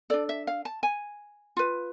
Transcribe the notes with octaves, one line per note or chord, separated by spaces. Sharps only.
D4 A4 D5
E5
F5
A5
G#5
F4 B4